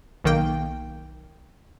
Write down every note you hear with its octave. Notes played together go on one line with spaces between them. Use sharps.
B1 D#3 A#3 G5